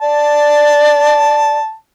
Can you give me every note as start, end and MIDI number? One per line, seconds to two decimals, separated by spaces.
0.01 1.59 74
0.01 1.74 81